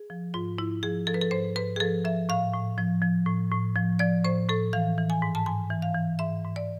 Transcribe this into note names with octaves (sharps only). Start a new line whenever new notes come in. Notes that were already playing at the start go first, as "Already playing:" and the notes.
Already playing: G#4
F3
G#2 F4
G#2 E4
F3 G#4
F3 A4
B4
A4
G#2 C5
G#2 B4
G#4
F3 A4
F3 E5
A2 F5
A2
F3
F3
A2
A2
F3
F3 D5
A2 C5
A2 A4
E3 F5
E3
G#5
G#2
A5
G#2 G#5
E3
F5
E3
G#2 E5
G#2
D5